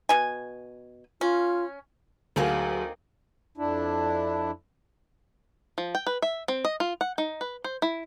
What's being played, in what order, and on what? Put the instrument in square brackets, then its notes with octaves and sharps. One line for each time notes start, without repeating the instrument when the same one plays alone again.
[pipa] B2 G#5
[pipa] C#4 [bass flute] F4
[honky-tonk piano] D2 [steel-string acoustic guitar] F#3 G#4 A4 [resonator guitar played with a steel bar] A#3 C4 D#4
[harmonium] F2 D4 E4
[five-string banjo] F3
G5
B4
E5
C4
D#5
F4
F#5
D#4
B4
C5
E4